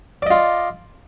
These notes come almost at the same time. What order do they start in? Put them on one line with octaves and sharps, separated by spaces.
D5 D#5 F4